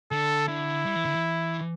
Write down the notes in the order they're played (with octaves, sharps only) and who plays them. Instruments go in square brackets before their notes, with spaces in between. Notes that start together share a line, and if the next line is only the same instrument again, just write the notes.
[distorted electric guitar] D3 [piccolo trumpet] A4
[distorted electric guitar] D3 [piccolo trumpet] E4
[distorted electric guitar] G3
E3
D3
E3